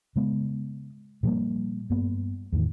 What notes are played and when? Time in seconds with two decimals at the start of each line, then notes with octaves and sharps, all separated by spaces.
0.16 C#3 G#3 B3
1.23 A#2 F3 G3 A#3
1.90 G2 A#3 B3
2.52 E2 A2 D#3